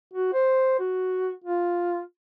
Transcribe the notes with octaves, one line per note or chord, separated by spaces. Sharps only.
F#4
C5
F#4
F4